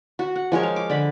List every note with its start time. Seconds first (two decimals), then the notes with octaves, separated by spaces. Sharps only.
0.19 F#4
0.36 F#5
0.52 F3 G#3 A#4 C#5
0.63 F5
0.76 D6
0.90 D3 B5